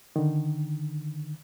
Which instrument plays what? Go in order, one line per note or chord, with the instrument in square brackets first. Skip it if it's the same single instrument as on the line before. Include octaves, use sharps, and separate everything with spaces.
[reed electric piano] D3 D#3